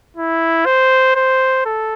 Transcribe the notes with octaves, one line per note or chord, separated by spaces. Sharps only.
E4
C5
C5
A4